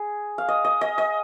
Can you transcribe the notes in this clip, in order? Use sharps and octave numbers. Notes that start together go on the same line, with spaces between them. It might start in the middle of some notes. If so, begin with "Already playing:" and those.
Already playing: G#4
F5
D#5
D#5
D#5
D#5